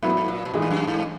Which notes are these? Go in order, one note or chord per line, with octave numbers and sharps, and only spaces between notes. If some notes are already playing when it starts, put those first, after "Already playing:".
G#2 F#3 B3 E4
A#2
G#2
A#2
B2
A#2 E3 G#3 D#4
G#2
F#2
G#2